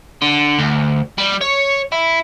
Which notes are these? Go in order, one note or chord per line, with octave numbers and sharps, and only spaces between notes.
D3
D2
G3
C#5
E4